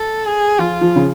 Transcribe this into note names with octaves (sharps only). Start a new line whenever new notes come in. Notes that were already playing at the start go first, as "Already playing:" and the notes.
Already playing: A4
G#4
F3 F4
F3
C#3